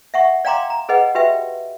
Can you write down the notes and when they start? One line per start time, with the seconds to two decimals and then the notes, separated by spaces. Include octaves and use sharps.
0.14 E5 F#5 C#6
0.45 D5 F5 G5 A#5 C6 D6
0.70 A#5
0.89 G#4 B4 D#5 F#5
1.15 F#4 G4 B4 E5 G5